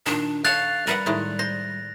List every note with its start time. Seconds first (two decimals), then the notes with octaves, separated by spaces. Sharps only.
0.06 A#2 D#3 D4
0.45 A4 C#5 F5 F#6 A6 F7
0.87 G3 A#4 B4 F#5
1.06 A2 D#3 G#3
1.39 C5 A#6